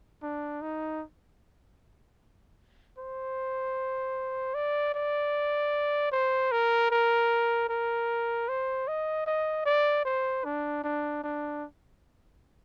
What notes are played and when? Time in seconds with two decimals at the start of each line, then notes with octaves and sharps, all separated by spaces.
0.23 D4
0.62 D#4
2.99 C5
4.55 D5
4.95 D5
6.12 C5
6.52 A#4
6.91 A#4
7.69 A#4
8.49 C5
8.88 D#5
9.27 D#5
9.66 D5
10.05 C5
10.45 D4
10.84 D4
11.24 D4